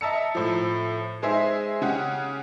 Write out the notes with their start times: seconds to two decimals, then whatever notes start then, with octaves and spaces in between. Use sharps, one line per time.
0.01 D#5 E5 A5 A#5 E6 C#7
0.35 A2 F3
1.22 G#3 D#4 G#4 C5 E5
1.82 C#3 C#4 G4 F#5